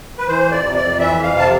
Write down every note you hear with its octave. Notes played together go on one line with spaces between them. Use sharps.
B4
E3 C5
F2
D5
C3
D5
F2
E3 E5
F2
F5
C3 A5